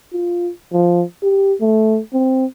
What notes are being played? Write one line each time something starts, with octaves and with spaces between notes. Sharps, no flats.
F4
F3
G4
A3
C4